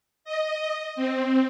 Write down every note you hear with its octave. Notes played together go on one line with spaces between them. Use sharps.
D#5
C4